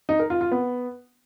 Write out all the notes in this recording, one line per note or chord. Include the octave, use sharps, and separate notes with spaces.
D#4
A#4
F4
F4
B3